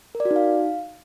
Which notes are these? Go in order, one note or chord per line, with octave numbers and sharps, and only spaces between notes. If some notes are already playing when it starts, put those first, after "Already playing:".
A#4
D5
F#4
D#4
F5